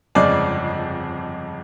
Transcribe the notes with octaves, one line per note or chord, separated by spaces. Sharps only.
G1 F2 C#3 F3 G#3 D5